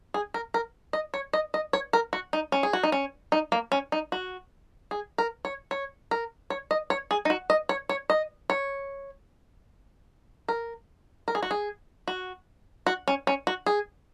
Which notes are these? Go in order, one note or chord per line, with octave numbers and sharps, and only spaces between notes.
G#4
A#4
A#4
D#5
C#5
D#5
D#5
C#5
A#4
F#4
D#4
C#4
G#4
F#4
D#4
C#4
D#4
A#3
C#4
D#4
F#4
G#4
A#4
C#5
C#5
A#4
C#5
D#5
C#5
G#4
D#4
F#4
D#5
C#5
C#5
D#5
C#5
A#4
A#4
G#4
F#4
G#4
F#4
F#4
C#4
C#4
F#4
G#4